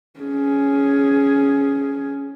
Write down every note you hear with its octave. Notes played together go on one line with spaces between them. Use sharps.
C#4 G#4